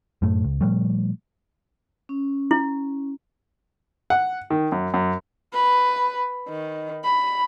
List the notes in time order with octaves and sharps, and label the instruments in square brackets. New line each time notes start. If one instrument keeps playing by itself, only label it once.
[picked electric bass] F#2 A2 A3
C#2
A#2 F3 G3 A3
[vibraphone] C#4
[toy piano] E4
[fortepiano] F#5
D#3
F#2
F#2
[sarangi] B4
D#3
B5